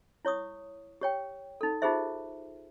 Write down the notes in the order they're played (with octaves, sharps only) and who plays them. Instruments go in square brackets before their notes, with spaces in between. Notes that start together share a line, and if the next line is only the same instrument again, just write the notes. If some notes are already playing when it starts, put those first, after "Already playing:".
[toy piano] E4 C#5 C#6 D#6
G4 C#5 G5
D#4 A4
D#4 F4 G4 G#4 C5 E5